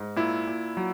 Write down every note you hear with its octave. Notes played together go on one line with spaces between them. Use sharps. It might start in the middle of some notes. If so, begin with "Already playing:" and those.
Already playing: G#2
A#2 E4
A#2
F#3